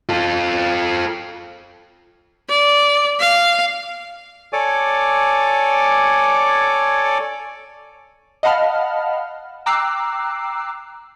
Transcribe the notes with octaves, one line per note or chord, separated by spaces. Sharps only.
F4 A4
D5
F5
A4 C#5 D5 G#5 D6
D#5 F5 F#5 A5 B5 F6
G5 A#5 D6 E6 F#6 C7